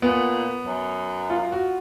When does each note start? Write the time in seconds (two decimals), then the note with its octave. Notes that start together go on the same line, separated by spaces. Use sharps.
0.02 A#2 B3
0.66 F#2
1.30 F4
1.52 F#4